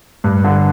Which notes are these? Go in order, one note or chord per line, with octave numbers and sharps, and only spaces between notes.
G2
D3